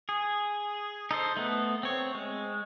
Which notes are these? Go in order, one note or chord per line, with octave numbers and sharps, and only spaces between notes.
G#4
D#4 A4 C5
A3 B3
C4 C#5
G#3